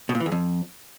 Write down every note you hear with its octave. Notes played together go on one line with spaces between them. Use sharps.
B2
A#2
E3
E2
F2